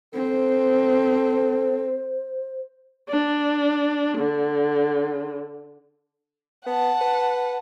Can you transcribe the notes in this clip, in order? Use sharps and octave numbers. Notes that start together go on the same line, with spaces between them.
C4 A4 C5
D4
D3
B3 F#5 A5
B4